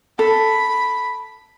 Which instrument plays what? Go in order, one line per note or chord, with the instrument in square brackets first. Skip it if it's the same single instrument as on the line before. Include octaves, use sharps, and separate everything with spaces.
[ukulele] A4 [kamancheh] B5